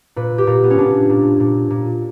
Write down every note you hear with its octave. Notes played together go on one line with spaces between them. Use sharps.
A#2 B4
G4
A#2 A#4
B3
C#4
A#2 D4
A#2
A#2
A#2